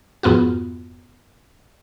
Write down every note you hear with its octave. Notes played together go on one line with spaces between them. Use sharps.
F2 G#2 B3 F4 F#4